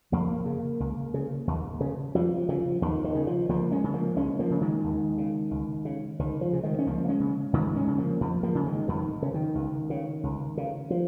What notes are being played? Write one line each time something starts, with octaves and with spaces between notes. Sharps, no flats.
F2 F3 A#3
C#3
C#2
C#3
D#2
C#3
F2 F3
C#3 F3
D#2 D#3
D#3
C#3
F3
C#2 F3 A#3
G#3 C#4
C#3
F3 A#3
C#2 G#3 C#4
F3 A#3
C#3
D#3 G#3
D#2
C#3
C#2
C#3
C#2 D#3
F3
C#3
D#3 G#3
C#4
C#2 F3 A#3
A#3
G#3 C#4
C#3
F2 D#3 G#3
G#3 C#4
C#3
F3 A#3
F2 F3
F3 A#3
C#3
D#3 G#3
F2 D#3
C#3
D#3
C#2
C#3
C#2
C#3
F3